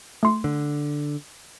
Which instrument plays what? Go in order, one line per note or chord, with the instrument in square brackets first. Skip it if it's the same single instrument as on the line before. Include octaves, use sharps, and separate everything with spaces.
[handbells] A3 C6
[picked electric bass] D3